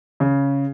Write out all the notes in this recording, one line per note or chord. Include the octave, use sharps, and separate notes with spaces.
C#3